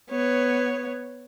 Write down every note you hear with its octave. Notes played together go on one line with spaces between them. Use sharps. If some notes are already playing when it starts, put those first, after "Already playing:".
B3 C#5